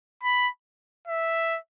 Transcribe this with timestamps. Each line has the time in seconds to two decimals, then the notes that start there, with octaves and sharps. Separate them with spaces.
0.23 B5
1.08 E5